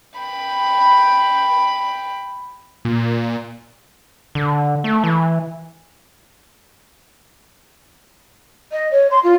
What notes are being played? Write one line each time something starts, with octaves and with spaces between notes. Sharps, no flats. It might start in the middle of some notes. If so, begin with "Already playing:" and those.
G5 B5
A#2
D3
A3
E3
D#5
C#5
C6
F4